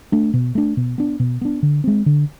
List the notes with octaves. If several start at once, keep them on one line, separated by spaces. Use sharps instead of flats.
A3 D4
B2
A3 D4
B2
B3 D4
B2
B3 D4
D3
G#3 C4
D3